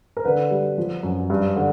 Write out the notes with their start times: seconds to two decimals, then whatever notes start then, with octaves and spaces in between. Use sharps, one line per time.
0.17 A#4
0.25 D3 B4
0.51 G3
0.78 F3
1.03 F#2
1.30 G2
1.56 D3